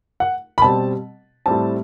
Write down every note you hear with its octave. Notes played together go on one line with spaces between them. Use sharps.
F#5
B5
B2 G3 C4 A5
A2 G3 C4 A5